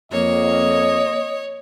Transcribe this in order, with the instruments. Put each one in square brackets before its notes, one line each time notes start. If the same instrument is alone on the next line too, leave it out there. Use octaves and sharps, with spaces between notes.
[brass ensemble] F2 [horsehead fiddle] A#3 [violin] C#5 [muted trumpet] D#5